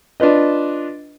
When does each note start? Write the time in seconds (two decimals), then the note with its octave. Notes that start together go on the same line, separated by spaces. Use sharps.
0.20 D4 F4 B4 D#5